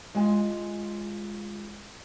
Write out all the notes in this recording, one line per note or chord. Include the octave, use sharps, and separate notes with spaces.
G#3 F4 G#5